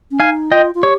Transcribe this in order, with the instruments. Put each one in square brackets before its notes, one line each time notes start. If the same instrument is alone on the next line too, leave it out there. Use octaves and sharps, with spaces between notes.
[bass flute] C#4
[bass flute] D#4 [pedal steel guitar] F5 G#5
[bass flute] F4 [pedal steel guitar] D#5 G5
[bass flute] F4
[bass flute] G4 [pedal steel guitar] C#5